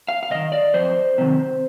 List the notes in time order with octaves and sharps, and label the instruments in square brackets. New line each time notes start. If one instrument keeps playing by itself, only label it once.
[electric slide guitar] F5
F5
C3 D#3 D#5
D5
F2 C5
C3 D#3